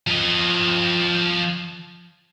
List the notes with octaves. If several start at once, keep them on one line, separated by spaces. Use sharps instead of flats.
F3 D#5